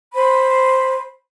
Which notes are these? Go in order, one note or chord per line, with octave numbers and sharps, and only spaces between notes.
C5 B5